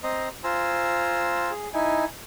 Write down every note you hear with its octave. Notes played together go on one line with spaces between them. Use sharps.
C4 D#5 A#5 C6
F4 C5 G#5 A#5 E6
G#4
D#4 E4 G#5